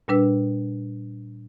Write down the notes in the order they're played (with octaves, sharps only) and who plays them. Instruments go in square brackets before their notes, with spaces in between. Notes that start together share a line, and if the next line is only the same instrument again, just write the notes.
[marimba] A#2 G3 D4 B4 E6